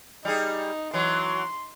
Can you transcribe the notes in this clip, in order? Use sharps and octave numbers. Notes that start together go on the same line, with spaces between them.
G3 D#4 G#4
E3 F#3 C6